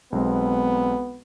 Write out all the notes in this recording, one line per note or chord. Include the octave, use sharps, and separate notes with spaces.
B1 G#3 B3 C4